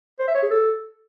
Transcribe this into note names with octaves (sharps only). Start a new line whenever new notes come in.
C5
E5
C#5
G#4
A4